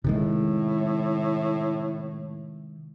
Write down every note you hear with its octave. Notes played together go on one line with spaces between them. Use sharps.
A2 C3 D#3 G#3